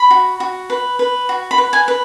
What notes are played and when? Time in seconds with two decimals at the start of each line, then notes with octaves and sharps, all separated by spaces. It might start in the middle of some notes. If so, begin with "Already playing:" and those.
Already playing: B5
0.11 F#4
0.40 F#4
0.70 B4
0.99 B4
1.29 F#4
1.51 B5
1.58 B4
1.73 G#5
1.88 B4